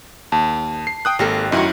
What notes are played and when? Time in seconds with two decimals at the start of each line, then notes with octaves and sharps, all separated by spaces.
0.32 D#2 A5
0.87 C7
1.05 G5 D#6 F#6
1.19 G#1 A#3 G4 A4
1.52 F#2 D#3 A3 E4 F#4